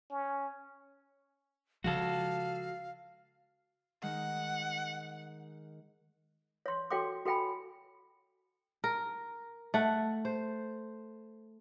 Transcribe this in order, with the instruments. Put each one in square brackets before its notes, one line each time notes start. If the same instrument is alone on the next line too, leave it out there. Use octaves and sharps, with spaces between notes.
[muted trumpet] C#4
[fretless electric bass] C#3 F3 G#3 [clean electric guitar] F#4 A4 [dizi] F5
[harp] D#3 G#3 [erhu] F#5
[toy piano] C#5 C6
F#4 A4 C#5 G5 C6 D6
F#4 A4 G5 G#5 B5
[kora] A#4
A3 F#5
C5